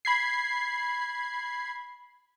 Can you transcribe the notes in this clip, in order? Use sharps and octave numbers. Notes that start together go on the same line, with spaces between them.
B5 G#6 C7